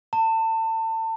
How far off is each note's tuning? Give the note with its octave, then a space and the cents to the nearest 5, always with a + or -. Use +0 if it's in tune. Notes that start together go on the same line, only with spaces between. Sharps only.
A5 +30